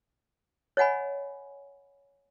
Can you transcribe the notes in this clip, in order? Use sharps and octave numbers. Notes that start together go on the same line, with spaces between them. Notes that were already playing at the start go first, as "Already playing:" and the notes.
C#5 D#5 F#5 G#5 B5